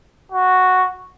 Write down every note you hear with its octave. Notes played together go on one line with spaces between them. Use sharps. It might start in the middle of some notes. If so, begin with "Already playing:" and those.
F#4